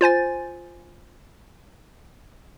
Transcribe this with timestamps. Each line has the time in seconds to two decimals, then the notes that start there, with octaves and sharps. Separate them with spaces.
0.01 F4 C5 G#5 A6